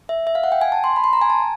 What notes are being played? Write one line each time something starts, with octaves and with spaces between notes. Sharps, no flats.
E5
E5
F5
F#5
G5
G#5
A5
C6
B5
C6
A#5
G#5
A5